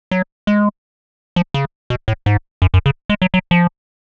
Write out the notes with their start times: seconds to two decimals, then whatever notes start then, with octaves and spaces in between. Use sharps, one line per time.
0.11 F#3
0.47 G#3
1.36 F3
1.54 C#3
1.90 B2
2.08 A2
2.26 G#2
2.62 F#2
2.74 F#2
2.86 C#3
3.10 G#3
3.22 F#3
3.34 F#3
3.51 F3